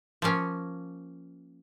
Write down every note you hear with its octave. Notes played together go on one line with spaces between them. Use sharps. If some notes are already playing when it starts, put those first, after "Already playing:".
F3 A#3 C#4